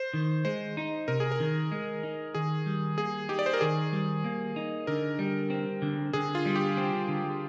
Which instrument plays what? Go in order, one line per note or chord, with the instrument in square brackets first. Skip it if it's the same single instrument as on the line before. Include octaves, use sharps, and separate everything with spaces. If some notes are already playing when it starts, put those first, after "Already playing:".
Already playing: [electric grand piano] C5
[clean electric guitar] D#3
[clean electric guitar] G#3 [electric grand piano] C5
[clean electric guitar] D#4
[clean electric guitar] C3 [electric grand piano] A#4
[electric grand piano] G#4
A#4
[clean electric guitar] D#3
G#3
D#4
[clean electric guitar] D#3 [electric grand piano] G#4
[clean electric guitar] G3
[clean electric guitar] A#3 [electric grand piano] G#4
[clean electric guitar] D#4 [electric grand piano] G4
[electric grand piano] D5
C5
A#4
[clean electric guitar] D#3 [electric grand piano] G#4
[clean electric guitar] G3
A#3
D#4
[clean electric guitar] D3 [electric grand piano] A#4
[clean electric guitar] G3
C4
D3
[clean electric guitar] D3 [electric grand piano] G#4
[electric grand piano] F4
[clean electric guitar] G3
[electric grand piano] G4
[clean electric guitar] C4
D3